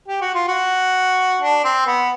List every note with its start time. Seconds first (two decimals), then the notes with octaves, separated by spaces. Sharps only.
0.08 G4
0.21 F#4
0.35 F4
0.48 F#4
1.42 D4
1.64 C4
1.86 B3